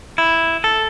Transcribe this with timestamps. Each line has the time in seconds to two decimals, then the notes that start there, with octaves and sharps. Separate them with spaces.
0.18 E4
0.64 A4